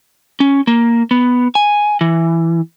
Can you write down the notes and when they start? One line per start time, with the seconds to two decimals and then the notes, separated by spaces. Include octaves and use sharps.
0.40 C#4
0.67 A#3
1.11 B3
1.55 G#5
2.01 E3